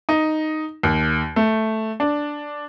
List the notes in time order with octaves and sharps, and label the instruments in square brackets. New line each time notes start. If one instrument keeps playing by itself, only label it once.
[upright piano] D#4
D#2
A3
D4